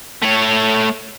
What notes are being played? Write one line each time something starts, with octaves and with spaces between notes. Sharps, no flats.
A3 C#5